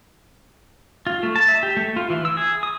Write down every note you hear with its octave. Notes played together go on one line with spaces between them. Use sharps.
F4
A3
A5
E5
G4
A3
F4
E3
E6
G#4
D#6